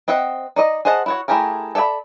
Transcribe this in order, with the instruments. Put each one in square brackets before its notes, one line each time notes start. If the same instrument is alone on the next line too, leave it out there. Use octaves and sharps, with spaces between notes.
[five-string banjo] C4 D#5 E5 F#5
D#4 D5 D#5
G#4 C5 D#5 F#5 A5
E4 F#4 C#5
A3 E4 G4 G#4 A#4
A4 D5 E5 G5 B5